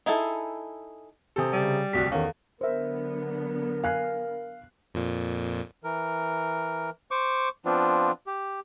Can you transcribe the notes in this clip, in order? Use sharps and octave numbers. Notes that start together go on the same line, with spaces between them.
D#4 E4 G#4 A4
C3 C4 G4 A4 G#5 D#6
C#3 G3
D1 C2 F#4 B6
E2 D#3 C#4 A4 F5
D3 F#3 B3 A#4 C5 E5
F5 G#5 F#6 C7
F2 A#2
E3 A#4
C5 C#6 D6
F3 B3 C4 D4 F4
G4